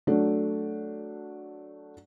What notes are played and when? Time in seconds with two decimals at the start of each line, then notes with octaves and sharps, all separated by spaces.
0.07 F#3 A3 D4